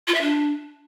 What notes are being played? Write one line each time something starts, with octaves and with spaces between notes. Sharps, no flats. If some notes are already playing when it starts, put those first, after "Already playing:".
F4
E5
D4